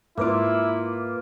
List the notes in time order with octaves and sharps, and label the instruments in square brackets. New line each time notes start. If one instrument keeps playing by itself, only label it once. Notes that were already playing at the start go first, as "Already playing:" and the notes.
[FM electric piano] G#2 B4 D6 [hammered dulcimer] A#3 F4 [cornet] E4